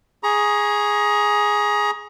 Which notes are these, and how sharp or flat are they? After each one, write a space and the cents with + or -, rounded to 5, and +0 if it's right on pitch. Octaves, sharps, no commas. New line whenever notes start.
G#4 +0 A#5 +30 C#6 +0